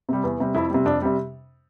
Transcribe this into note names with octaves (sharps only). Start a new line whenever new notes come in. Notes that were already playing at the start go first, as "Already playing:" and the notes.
C3 G3
E2
C3 G3
F2 E4
C3 G3
F2 D4
C3 G3